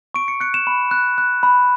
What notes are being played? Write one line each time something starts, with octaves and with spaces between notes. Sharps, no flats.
C#6 D7
C#7
F#6 C#7
E7
B5
F#6
F#6
B5